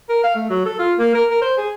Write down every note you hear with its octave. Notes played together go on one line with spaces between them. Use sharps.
A#4
F5
A3
F#3
A4
F4
A#3
A#4
A#4
C5
G#4